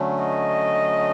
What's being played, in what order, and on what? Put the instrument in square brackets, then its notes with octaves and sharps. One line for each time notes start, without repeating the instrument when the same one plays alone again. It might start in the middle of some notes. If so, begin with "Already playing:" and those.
Already playing: [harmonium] D3 F#3 A3 C#4
[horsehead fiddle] D#5